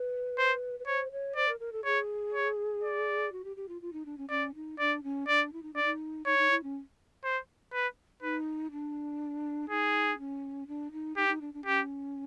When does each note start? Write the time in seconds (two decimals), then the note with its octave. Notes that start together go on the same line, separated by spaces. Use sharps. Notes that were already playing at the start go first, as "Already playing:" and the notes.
Already playing: B4
0.38 C5
0.79 B4
0.87 C5 C#5
1.12 C#5
1.36 C5 D5
1.48 A#4
1.60 A#4
1.72 A4
1.85 G#4 C#5
2.34 C#5
2.83 D5
3.32 F#4
3.44 G4
3.56 G4
3.68 F4
3.82 F4
3.93 D#4
4.05 D4
4.18 C#4
4.30 C#4 D5
4.55 D#4
4.79 D4 D5
5.03 C#4
5.28 D4 D5
5.53 E4
5.63 D#4
5.73 D4 D5
5.84 D#4
6.26 D#4 C#5
6.38 D#4
6.51 E4
6.63 C#4
7.24 C5
7.73 B4
8.22 D#4 B4
8.71 D4
9.70 D#4 G#4
10.18 C#4
10.67 D4
10.92 D#4
11.17 D#4 G4
11.29 D#4
11.41 D4
11.54 D4
11.66 C#4 G4